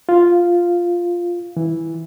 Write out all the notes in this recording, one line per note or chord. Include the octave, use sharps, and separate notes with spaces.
F4
E3